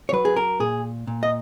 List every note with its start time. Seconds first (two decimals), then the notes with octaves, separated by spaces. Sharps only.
0.09 C#5
0.13 F#3 B4
0.25 G#4
0.36 A#4
0.60 A#2 G#4
1.07 A#2
1.23 D#5